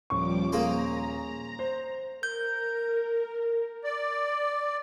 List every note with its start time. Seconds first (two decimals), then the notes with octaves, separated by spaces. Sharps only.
0.10 D#1 F3 G3 C#6 D6
0.53 A#3 G#4 C5 A#5
1.59 C5
2.23 A#4 G6
3.84 D5